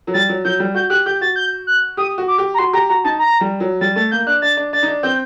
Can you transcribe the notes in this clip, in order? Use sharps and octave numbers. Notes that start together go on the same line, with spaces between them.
F#3
G3 A6
F#3
F#3 G6
G3
F#4 G6
G4 F#6
G4 G6
F#4 A6
G6
F#6
G4 D#6
F#4
D6
G4
A#5
F#4 C6
G4 A#5
F#4 A#5
D#4 A5
A#5
G3
F#3
G3 A6
A3 A6
A#3 G6
D4 F#6
D4 A6
D4
D4 A6
D#4
D4
C4 G6